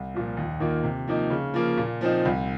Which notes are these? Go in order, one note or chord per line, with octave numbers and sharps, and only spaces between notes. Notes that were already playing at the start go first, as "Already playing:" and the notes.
Already playing: C2
A#2 F3
D#2
D#3 A#3 F4
C3
F3 A#3 D#4
C#3
F3 A#3
A#2
F3 C4 D#4
C2